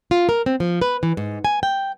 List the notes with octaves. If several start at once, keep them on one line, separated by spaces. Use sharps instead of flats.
F4
A#4
C4
F3
B4
E3
G#2
G#5
G5